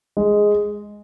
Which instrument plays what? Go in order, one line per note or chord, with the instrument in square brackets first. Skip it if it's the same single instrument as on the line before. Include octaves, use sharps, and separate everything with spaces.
[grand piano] G#3